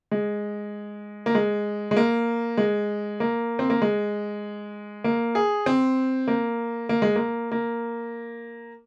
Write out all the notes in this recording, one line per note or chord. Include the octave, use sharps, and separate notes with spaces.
G#3
A#3
G#3
G#3
A#3
G#3
A#3
C4
A#3
G#3
A#3
G#4
C4
A#3
A#3
G#3
A#3
A#3